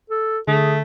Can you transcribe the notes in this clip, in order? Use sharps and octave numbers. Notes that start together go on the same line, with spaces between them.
A4
D3 A3 G#4